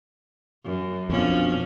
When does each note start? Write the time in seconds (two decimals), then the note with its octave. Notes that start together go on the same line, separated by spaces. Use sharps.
0.64 F#2
1.10 F2 B2 F3 C#4 D4